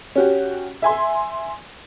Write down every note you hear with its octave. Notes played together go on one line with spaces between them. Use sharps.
C#4 F#4 G4
E5 G#5 C6